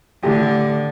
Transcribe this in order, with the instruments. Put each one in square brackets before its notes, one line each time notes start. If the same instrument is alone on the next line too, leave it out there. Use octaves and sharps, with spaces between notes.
[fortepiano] A2 G4 [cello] D3